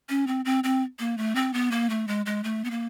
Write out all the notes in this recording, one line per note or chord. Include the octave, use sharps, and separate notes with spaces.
C#4
C4
C4
C4
A#3
A3
C4
B3
A#3
A3
G#3
G#3
A3
B3
A#3